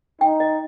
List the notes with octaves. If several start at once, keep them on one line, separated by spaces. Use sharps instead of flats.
D#4 G5
D#5